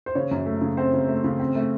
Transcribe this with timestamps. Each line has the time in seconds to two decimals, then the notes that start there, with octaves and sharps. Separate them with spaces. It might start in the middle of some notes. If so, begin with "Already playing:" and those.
0.06 C5
0.15 C#3 C#5
0.31 F#2
0.46 A3
0.61 C#3
0.77 C4 C5
0.93 C#3
1.08 A3
1.24 C#3
1.40 C4
1.55 A3